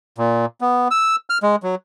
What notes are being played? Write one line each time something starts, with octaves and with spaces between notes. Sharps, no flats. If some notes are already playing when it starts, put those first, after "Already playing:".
A#2
B3
E6
F6
G#3
F#3